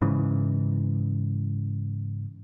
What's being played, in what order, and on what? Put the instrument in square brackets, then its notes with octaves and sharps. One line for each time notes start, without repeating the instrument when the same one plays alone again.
[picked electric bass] G#2 C#3 E3